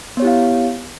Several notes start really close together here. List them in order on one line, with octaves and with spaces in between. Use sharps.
B3 C#5 G4 E4 F5